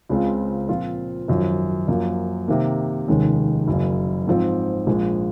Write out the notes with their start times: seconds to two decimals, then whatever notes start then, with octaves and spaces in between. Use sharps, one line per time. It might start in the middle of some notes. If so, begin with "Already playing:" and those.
0.09 C#2 C#3 G#3 C4 F4
0.69 A#2 F3 C4 F4
1.28 G#1 F#2 F3
1.88 F#2 F3 A#3
2.48 C3 D#3 A#3
3.08 F1 D#2 D#3 G#3 C#4
3.68 F#1 F#2 C#3
4.27 G#2 F3 C4
4.87 A#1 A#2 G#3